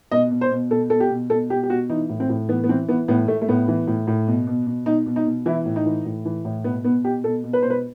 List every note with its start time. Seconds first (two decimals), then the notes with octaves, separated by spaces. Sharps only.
0.11 B2 D#5
0.31 B2
0.41 C5
0.51 B2
0.71 B2 A4
0.90 B2 A4
1.00 G4
1.10 B2
1.30 B2 A4
1.50 B2 G4
1.63 G4
1.70 B2 F#4
1.90 E3 D#4
2.09 A2
2.20 C4
2.29 A2
2.49 E3 B3
2.64 B3
2.69 E3 C4
2.88 E3 B3
3.08 A2 B3
3.28 A2 A3
3.42 A3
3.48 A2 B3
3.68 E3
3.87 A2
4.07 A2
4.28 B2
4.47 B2
4.67 B2
4.86 B2 D#4
5.06 B2
5.16 D#4
5.26 B2
5.46 E3 E4
5.66 A2
5.76 D#4
5.86 E3
6.05 A2
6.25 E3
6.45 A2
6.64 B2 B3
6.84 B2 B3
7.04 B2 G4
7.24 B2 A4
7.44 B2
7.53 B4
7.62 B2 C5
7.70 B4